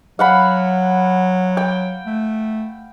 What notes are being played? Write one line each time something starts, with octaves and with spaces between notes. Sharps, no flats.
F#3 F5 F#5 B5
G5
A3